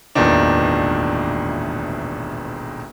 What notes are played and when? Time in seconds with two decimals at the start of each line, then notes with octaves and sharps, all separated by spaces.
0.15 E1 A1 D2 A#2 D#3 D4